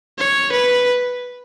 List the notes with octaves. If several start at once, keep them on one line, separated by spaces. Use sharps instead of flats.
C#5
B4